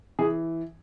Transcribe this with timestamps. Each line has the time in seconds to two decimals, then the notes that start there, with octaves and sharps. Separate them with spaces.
0.19 E3 G#4